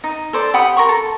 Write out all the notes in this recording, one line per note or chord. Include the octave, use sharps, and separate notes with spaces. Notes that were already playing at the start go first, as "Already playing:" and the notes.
D#4
A4 C5 D5
G4 F#5 B5 D#6
A#4 C6 C#6
A4